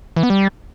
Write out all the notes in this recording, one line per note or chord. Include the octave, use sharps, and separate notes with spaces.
E3
B3
G3